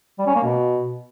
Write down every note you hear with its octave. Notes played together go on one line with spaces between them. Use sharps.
G3
C#4
A#3
B2